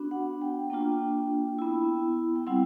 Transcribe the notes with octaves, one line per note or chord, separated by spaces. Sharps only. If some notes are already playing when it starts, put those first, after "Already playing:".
Already playing: B3 D4 F#4
F#5
G5
A#3 D4 F4 G5
B3 E4
G5
G3 C4 E4 F#5